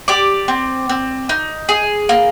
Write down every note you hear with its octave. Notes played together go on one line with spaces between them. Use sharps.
G4 D5 D6
C4
C4
D#4
G#4
A#3